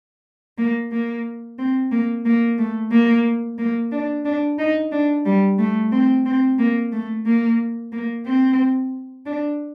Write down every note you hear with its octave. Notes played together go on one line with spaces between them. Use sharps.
A#3
A#3
C4
A#3
A#3
A3
A#3
A#3
D4
D4
D#4
D4
G3
A3
C4
C4
A#3
A3
A#3
A#3
C4
D4